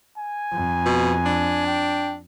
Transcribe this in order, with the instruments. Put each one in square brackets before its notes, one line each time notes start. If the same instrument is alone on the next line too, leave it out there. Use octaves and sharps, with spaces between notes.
[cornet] G#5
[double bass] F2
[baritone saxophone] B2
D4
[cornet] G5